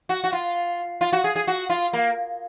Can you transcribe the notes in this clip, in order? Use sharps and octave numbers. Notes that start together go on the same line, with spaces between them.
F#4
F#4
F4
F4
F#4
G#4
G#4
F#4
F4
A#3